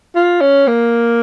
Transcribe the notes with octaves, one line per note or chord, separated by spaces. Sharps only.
F4
C#4
A#3